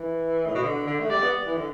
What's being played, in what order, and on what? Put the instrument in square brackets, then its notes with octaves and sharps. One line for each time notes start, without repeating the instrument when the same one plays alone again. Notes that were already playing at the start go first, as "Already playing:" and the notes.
Already playing: [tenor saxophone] E3
A2
B2
D3
D3
A3
[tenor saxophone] G3 [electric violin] D5
[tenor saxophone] B3
E3
D3